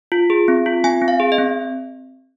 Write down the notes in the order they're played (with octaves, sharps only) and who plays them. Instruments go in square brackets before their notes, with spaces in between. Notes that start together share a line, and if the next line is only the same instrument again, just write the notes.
[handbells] F4
G#4
C4
F4
C4 G#5
C4
F5
G#4
D#5
C4